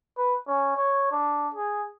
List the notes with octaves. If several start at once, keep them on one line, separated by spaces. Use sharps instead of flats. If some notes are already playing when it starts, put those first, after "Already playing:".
B4
C#4
C#5
D4
G#4